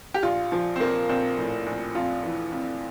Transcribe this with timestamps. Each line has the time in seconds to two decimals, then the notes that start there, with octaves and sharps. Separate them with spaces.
0.14 G4
0.23 A#1 F4
0.52 F3
0.76 C4
0.80 A#1 A#3
1.09 A#1 C4
1.38 A2
1.66 A#1
1.95 F2 F4
2.23 E3
2.52 F2